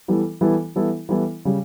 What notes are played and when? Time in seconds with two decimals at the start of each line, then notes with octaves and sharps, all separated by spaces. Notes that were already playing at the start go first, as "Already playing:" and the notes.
0.08 E3 G3 B3 E4 A4
0.41 E3 G3 B3 E4 A4
0.76 E3 G3 B3 E4 A4
1.09 E3 G3 B3 E4 A4
1.45 C#3 G3